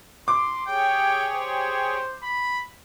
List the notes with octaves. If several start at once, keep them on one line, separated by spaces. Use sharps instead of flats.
C6 D6
G4 G#4 C#5 G5
C5
B5